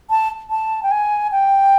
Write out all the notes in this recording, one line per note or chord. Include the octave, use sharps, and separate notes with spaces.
A5
A5
G5
G#5
G5